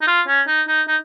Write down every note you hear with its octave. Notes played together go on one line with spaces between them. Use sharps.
D#4
F4
C#4
D#4
D#4
D#4